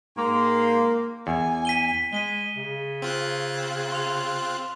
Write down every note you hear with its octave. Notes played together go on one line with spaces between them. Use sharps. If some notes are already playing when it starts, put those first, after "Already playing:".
G#2 A#3 G5 C6
E2 G#5
B6 D#7 G7
G#3 B6 D#7 G7
C#3
C4 F4 F#6
C6 F7